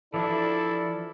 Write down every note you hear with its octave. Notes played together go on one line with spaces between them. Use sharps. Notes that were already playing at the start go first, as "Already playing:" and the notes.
E3 F3 D4 E4 A4 D5